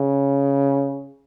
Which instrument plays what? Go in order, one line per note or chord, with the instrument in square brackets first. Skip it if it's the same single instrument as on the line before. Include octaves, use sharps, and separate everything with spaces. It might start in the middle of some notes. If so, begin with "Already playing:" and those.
Already playing: [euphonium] C#3